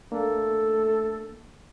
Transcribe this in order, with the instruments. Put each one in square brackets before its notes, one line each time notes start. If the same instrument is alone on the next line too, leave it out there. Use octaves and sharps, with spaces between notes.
[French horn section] A3 [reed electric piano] A#3 D4 [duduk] A4